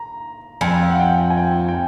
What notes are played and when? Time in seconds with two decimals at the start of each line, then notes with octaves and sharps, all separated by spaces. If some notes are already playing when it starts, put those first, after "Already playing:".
Already playing: A#5
0.61 F2 G#5
0.80 F5
0.90 F#5
1.00 G5
1.30 G#5
1.37 G5
1.68 G5